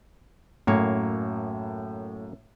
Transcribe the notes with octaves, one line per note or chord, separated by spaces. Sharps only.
F#2 A2 A#3 C#5